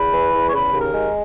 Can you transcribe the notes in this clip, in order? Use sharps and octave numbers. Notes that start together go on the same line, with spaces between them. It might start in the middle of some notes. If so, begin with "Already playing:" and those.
Already playing: E2 B4
E3
E2
C#5
C#3 B4
D#2
A#4
G#3